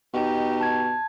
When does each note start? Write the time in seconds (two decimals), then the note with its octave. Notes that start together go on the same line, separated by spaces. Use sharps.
0.14 B2 D#4 G4
0.61 A5 G#6